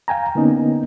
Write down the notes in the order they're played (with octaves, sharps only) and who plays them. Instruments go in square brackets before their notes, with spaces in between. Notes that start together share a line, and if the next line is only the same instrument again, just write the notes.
[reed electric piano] F5 G5 G#5 A#5
D3 A#3 B3 C#4 D#4